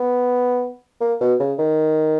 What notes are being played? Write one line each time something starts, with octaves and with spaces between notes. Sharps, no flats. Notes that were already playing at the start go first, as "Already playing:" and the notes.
Already playing: B3
A#3
B2
C#3
D#3